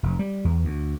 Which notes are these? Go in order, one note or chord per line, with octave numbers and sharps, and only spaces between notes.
F1
G3
E2
D2